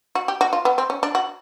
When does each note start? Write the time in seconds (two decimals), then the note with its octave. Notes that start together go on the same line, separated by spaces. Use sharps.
0.15 F#4
0.28 G4
0.41 F#4
0.53 F4
0.65 B3
0.78 C4
0.90 C#4
1.03 D4
1.15 F#4